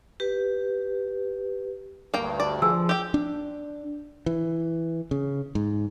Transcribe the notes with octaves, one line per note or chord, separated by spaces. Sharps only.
G4 B4
D2 G2 A#3 G5
D5
F3 G#4 G#5 E6
G4 G5
D4
E3
C#3
G#2